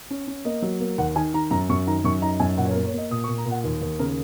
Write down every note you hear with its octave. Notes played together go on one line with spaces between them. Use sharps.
C#4
C#4
A#3 D#5
F#3
A#3
D#2 F#5
D#3 G#5
D#3 A#5
F#2 A#5
F#2 C#6
D#3 A#5
F#2 C#6
D#4 A#5
F#2 G#5
A#2 F#5
C#5
A#4
A#3
C#5
A#3 D#5
A#2 D#6
C#6
A#2
A#5
A#2
F#5
D#2
D#2
C#3 A#4